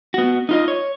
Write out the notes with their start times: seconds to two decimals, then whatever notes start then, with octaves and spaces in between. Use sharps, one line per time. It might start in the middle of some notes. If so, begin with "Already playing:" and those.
0.14 B3 F#4
0.49 D#4 F4 D#5
0.68 C#5